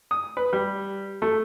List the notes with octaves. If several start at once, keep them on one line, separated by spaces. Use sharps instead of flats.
D#6
B4
G3
A3